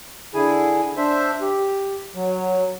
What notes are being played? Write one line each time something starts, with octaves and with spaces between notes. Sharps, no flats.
D3 E4 G#4 G#5
D4 C5 E5
G4
F#3